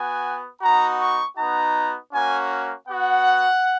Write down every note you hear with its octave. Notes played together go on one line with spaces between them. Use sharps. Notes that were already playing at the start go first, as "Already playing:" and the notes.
Already playing: B3 F#4 G#5
B3 D#4 F#4 A#5
C#6
B3 D#4 F#4 A#5
A#3 C#4 F#4 G#5
B3 F#4 F#5